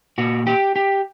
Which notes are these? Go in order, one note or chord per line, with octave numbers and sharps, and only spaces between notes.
A#2 F#4
G4
G4